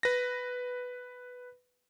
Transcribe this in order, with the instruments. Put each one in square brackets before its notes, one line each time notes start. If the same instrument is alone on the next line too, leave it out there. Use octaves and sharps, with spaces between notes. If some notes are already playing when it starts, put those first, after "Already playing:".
[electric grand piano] B4 A#6